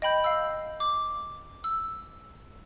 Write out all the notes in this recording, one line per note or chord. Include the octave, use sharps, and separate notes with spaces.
D#5 G5 B5 G6
F5 E6
D6
E6